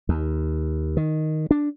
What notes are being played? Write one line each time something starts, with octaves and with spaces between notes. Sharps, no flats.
D#2
D#3
D4